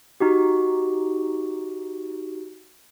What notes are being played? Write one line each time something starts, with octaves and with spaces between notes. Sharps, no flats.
D#4 F#4 G4